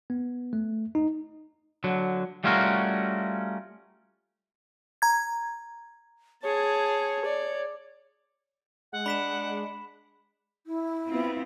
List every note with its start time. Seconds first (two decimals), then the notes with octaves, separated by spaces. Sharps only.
0.10 B3
0.53 A3
0.95 D#4
1.84 D3 F#3
2.44 G3 A3 C#4 F4 F#4 A#4
5.02 A#5 G#6
6.43 G#4 C#5 A5
7.25 D5
8.93 G#3 F#5
9.06 D4 B5 B6 E7
10.66 E4
11.08 B3 C4 F4